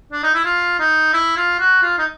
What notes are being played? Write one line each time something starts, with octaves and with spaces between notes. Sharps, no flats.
D4
D#4
E4
F4
D#4
E4
F4
F#4
F4
D#4